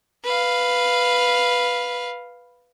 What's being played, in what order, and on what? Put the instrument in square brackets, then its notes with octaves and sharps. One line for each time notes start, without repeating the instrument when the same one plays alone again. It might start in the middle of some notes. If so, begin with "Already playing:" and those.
[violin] B4 F5